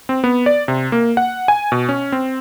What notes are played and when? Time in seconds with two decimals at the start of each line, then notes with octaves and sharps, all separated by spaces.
0.09 C4
0.24 B3
0.46 D5
0.68 C3
0.92 A#3
1.17 F#5
1.48 G#5
1.72 B2
1.89 C#4
2.12 C4